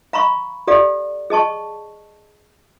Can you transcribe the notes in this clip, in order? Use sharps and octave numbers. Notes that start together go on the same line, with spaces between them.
F5 A#5 B5 C#6
G4 A4 D5 F5
G#4 D#5 A5 C#6